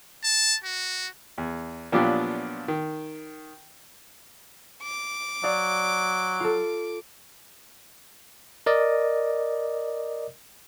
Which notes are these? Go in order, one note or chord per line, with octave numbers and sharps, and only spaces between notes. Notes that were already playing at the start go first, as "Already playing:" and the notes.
A5
F#4
E2
A#2 F3 F#3 B3 D4 G4
D#3
D6
F#3 D5 F5 D#6
F4 A4
A#4 D5 D#5